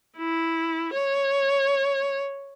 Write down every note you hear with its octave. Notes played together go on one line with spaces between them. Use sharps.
E4
C#5